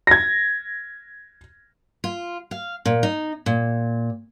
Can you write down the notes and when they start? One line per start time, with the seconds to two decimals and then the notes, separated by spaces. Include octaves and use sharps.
0.07 G#6 A#6
2.04 F4
2.51 F5
2.85 A#2
3.03 D#4
3.46 A#2